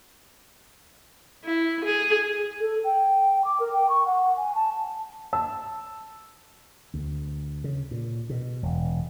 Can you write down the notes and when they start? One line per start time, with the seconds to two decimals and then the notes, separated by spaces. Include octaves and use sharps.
1.44 E4
1.85 G#4
2.60 A4
2.84 G5
3.44 D6
3.60 A#4
3.72 G5
3.89 C#6
4.05 F#5
4.37 G#5
4.55 A5
5.33 A5 E6
6.94 D2
7.64 C#3
7.91 A#2
8.30 B2
8.63 E1